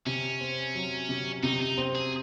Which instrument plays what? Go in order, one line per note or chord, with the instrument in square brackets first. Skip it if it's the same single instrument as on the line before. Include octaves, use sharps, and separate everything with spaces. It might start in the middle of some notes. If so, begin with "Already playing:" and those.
[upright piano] C3 [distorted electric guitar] C#4
[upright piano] C4
F#3
C3
[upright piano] C3 [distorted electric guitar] D#4
[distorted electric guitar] D#4
[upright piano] C4
[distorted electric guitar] G#4